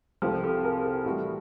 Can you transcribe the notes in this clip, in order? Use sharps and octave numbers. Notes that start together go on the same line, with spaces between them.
C2 C3 F3 G4 A4
G4 A4
G#4 A#4
G4 A4
A2 E3 G3 E4 F#4